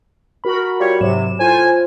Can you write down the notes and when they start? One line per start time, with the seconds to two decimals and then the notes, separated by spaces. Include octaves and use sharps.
0.44 F#4 A#4 B5
0.80 G3 F4 C#5
1.01 G#2 C3 F#3 E7
1.39 A2 F4 C5 G#5